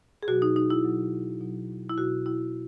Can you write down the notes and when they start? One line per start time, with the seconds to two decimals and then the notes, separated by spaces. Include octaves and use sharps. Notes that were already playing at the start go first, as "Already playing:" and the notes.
0.23 G#4
0.28 B2 F#3 F#4
0.42 D#4
0.56 D#4
0.70 E4
0.84 B2 F#3
1.41 B2 F#3
1.89 E4
1.97 B2 F#3 F#4
2.26 E4